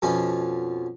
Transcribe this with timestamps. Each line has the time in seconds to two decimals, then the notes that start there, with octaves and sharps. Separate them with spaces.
0.02 F2 B2 F3 C#4